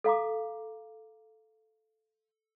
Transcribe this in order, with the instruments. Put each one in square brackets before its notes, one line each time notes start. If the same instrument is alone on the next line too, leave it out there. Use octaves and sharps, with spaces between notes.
[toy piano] A4 F5 A#5 D6